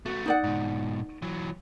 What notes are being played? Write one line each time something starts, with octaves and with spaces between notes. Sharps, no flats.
A3 B3 F#4
D#4 D5 F#5
G#2 B2
E3 F#3